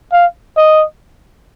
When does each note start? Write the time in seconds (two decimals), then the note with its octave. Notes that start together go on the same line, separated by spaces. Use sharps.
0.12 F5
0.57 D#5